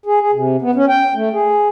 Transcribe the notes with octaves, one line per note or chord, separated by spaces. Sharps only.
G#4
G#4
C3
B3
C#4
G5
A3
G#4